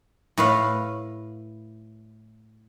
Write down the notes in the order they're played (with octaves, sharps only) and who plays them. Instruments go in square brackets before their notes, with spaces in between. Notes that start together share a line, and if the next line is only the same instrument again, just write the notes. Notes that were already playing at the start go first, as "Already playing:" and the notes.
[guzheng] A2 B4 F5